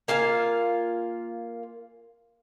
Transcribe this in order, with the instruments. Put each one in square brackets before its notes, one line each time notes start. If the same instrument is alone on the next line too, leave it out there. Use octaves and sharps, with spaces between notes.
[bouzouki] A#3 F4 F5 G#5